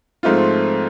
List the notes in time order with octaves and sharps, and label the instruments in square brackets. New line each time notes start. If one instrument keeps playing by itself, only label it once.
[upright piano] G#2 F3 A3 C4 F4